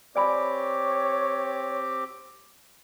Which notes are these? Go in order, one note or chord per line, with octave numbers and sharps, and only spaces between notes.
C4 G4 C#5 D5 G#5 B5 D6